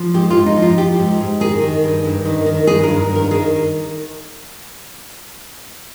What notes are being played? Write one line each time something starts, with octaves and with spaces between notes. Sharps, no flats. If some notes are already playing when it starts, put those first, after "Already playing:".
Already playing: F3
G#2 G4
F4
G#2
D#4
F3
F4
F3 G4
G#2
G#2
D#3 G#4
D#3
G2
G2
D#3
D#3
G2 G#4
G2 A#4
D#3
A#4
D#3 G#4